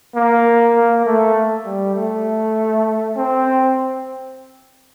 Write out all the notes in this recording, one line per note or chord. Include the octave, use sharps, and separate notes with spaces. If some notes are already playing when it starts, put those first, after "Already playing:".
A#3
A#3
A3
G3
A3
C4